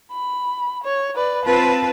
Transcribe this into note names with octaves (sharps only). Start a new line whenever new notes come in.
B5
C#5
B4 D5
C4 F4 B4 A5